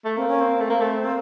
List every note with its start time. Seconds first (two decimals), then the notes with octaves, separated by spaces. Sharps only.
0.05 A3
0.16 A#3 C4
0.28 C#4
0.40 C4
0.60 A3
0.70 A#3
0.80 A3
1.05 A#3